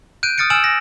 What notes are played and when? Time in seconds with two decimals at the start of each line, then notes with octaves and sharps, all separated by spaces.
0.23 F#6 G6 D7 D#7
0.38 D#6 F6 A6 C#7 D7
0.50 G#5 E6 F6 D7 E7 F#7
0.64 A#6